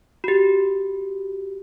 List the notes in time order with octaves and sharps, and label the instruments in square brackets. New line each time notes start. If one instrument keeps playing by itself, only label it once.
[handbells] F#4 G4